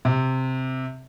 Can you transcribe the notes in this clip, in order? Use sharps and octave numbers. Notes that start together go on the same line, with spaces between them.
C3